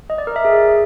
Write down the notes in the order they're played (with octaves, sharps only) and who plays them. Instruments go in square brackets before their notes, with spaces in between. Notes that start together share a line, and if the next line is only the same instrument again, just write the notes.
[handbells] D#5
D5
A#4
E5
G#4